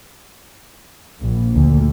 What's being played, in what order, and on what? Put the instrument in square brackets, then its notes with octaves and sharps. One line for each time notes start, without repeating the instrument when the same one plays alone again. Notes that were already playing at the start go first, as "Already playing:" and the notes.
[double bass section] A#1
D2